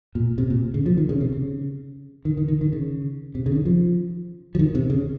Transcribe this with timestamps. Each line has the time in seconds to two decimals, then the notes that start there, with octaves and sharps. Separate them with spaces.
0.15 A#2
0.38 C3
0.50 A#2
0.74 C#3
0.86 F3
0.98 D#3
1.09 C#3
1.21 C3
1.33 C#3
2.25 D#3
2.37 D#3
2.48 D#3
2.61 D#3
2.73 C#3
3.35 C3
3.46 C#3
3.56 D#3
3.65 F3
4.55 F3
4.59 D#3
4.75 C3
4.90 C#3